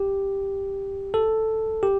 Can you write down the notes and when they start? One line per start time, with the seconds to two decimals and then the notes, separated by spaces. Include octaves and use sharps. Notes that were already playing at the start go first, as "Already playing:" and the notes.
Already playing: G4
1.14 A4
1.83 G4